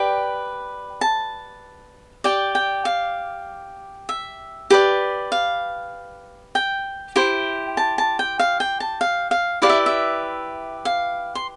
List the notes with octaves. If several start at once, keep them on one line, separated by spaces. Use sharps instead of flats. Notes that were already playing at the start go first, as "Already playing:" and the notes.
Already playing: G4 B4 D5 G5
A5
G4 D5 G5
G5
F5
E5
G4 B4 D5
F5
G5
E4 G4 C5
A5
A5
G5
F5
G5
A5
F5
F5
E4 G4 B4 D5 F5
E5
E5
F5
C6